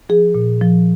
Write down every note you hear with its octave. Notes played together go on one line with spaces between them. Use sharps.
F3 G#4
A#2
F3